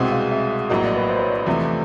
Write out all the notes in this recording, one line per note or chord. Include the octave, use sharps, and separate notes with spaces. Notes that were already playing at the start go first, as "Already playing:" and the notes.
Already playing: C2 B2 G#3 C4 F#5
F5
E5
A#1 A2 F#3 A#3 D#5
D5
B4
C5
C#5
D5
E2 C3 F3 A3